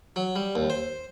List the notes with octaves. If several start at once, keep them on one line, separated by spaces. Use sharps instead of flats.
F#3
G3
D#2
C5